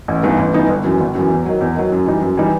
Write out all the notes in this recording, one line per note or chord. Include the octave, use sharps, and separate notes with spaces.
A1
G2 E3 B3 D#4
A1
G2 E3 B3 D#4
G1
F#2 E3
G1
F#2 E3
E2
D#3 F#3
E2
D#3 F#3
F#2
E3 G3 D#4
F#2
E3 G3 D#4